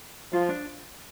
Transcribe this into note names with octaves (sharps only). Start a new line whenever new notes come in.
F3 F4
D4